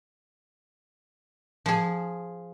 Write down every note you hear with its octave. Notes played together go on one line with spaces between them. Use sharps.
F3 G#4